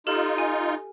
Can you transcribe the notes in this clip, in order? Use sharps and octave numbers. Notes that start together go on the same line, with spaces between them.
D#4 F4 G4 A4 F6
G#5